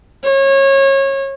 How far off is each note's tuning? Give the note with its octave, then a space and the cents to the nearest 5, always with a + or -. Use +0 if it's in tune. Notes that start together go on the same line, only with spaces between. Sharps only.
C#5 -25